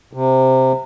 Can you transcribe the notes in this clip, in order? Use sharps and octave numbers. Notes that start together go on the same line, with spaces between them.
C3